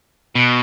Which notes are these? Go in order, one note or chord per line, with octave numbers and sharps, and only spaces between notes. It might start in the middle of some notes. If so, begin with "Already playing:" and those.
B2